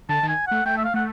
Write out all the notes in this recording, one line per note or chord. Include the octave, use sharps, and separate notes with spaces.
D3 A5
D#3
G#5
A3 F#5
A3 G5
E5
F5
A3 F#5